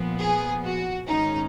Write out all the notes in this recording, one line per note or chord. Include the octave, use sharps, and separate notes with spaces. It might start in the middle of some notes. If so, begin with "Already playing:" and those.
Already playing: A#2 F3 B3
G#4
F#4
G#2 D#3 G#3 C#4 D#4